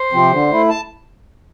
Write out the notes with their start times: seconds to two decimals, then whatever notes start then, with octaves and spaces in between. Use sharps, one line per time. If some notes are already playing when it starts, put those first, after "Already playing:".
Already playing: C5
0.13 C3 F3 C4
0.31 D3
0.51 A3 E4
0.69 A5